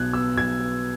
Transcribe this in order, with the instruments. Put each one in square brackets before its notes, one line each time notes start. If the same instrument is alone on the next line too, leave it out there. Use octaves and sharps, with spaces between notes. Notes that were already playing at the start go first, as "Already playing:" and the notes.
Already playing: [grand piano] B1 B2 F#6 G#6
B3 E6
B1 G#6
B3